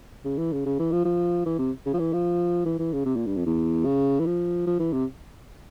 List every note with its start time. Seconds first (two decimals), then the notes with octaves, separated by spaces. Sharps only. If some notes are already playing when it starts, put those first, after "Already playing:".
0.25 C#3
0.38 E3
0.53 C#3
0.66 C#3
0.79 E3
0.92 F3
1.05 F3
1.46 E3
1.59 C3
1.86 C#3
1.93 F3
1.99 E3
2.13 F3
2.65 E3
2.79 E3
2.93 C#3
3.05 C3
3.16 A#2
3.26 G2
3.36 F2
3.46 E2
3.85 C#3
4.20 E3
4.26 F3
4.67 F3
4.79 E3
4.93 C3